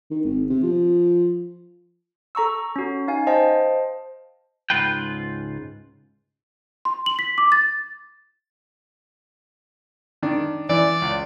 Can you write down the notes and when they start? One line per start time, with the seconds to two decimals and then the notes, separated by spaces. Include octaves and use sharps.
0.11 D#3
0.25 G#1
0.49 C3
0.63 F3
2.35 A4 A#5 C#6 E6
2.76 C#4 F#4
3.08 D#4 F5 G#5
3.27 C5 D#5 F5 G5 A5
4.70 C#2 G#2 F4 B4 G5
6.85 C6
7.06 F#7
7.19 B6
7.38 D6
7.52 A6
10.23 D#3 D4
10.69 E3 D5
11.02 C#2